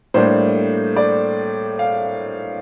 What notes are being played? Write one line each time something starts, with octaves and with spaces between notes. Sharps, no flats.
A2 G3 A#3 D4 C5
D5
F5